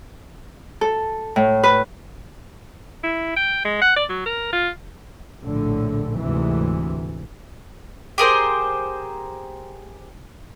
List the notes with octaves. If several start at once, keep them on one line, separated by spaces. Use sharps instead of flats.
A4
A2
B4
E4
G5
G#3
F#5
D5
F#3
A#4
F4
A#1 A2 D3
D2 G#2 C3 E3
G4 G#4 A#4 C5